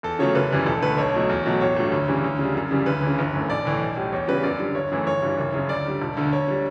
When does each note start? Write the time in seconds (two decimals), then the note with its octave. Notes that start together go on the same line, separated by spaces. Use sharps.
0.03 E2 A4
0.19 C#3 F#3 A3 C#5
0.35 F#1 B4
0.51 F#2 E3 G3
0.66 E1 A4
0.82 D2 D3 A3 B4
0.97 B1 C#5
1.14 B2 F#3 A3
1.29 E2
1.46 B2 F#3 A3
1.61 A1 C#5
1.76 G2 F#3 A3
1.92 D2
2.08 C#3 E3 G3
2.24 D2
2.39 C#3 G3
2.55 F#2
2.71 C#3 E3 G3
2.86 D2 B4
3.02 C#3 E3
3.18 G1
3.34 F#2 E3 A3
3.49 B1 D5
3.65 A2 E3 A3
3.81 B1
3.96 A2 G3
4.12 E2 C#5
4.28 C#3 G3 B4
4.43 F#2 D5
4.60 D3 G3
4.75 G1 C#5
4.91 F#2 E3 A3
5.07 G1 C#5
5.22 G2 E3 G3
5.39 F#1
5.54 F#2 C#3
5.69 D2 D5
5.85 D3 G3
6.02 E1
6.17 D2 D3
6.32 D2 C#5
6.48 D3 G3